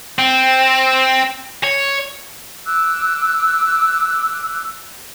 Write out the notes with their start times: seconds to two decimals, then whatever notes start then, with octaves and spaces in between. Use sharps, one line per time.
0.19 C4
1.64 C#5
2.66 D6 E6 F#6